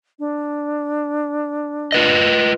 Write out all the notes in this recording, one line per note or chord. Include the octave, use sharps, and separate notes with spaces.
D4
F4 B4 D#5